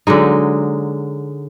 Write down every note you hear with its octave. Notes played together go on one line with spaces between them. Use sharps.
D3 F#3 G#3 D#4